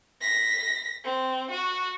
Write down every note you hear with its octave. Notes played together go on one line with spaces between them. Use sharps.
A#6 B6
C4
F#4